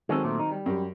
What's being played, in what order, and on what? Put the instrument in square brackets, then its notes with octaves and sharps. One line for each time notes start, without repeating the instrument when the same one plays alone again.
[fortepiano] D#3 F#3 C4 [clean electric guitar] G#3 C#4 A4
[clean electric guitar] A#2 A3
D#4
G3
[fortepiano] F#2 G4